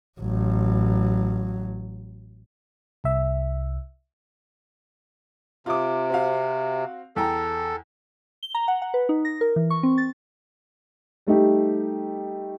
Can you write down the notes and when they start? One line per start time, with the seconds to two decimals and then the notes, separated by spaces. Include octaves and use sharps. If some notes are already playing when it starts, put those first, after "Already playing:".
0.20 A1 F#3
3.04 C2 E5
5.66 C3 F4 D6
6.10 C4 F#4 F5
7.16 E2 A4 G5 A#5
8.43 G7
8.55 A#5
8.68 F#5
8.82 F#5
8.94 B4
9.09 D#4
9.25 A#6
9.41 A#4
9.56 E3
9.70 C#6
9.83 C4
9.98 A6
11.27 G3 A3 D#4 G4